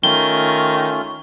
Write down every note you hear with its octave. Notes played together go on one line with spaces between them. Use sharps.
D#3 A3 C#4 F4 G7